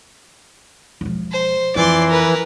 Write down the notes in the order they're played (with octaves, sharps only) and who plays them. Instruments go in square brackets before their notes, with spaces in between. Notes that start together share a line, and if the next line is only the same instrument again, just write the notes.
[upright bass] E1 F3
[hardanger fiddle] C5
[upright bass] F2 [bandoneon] E3 [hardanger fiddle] D5 C6
[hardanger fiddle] A#4 B4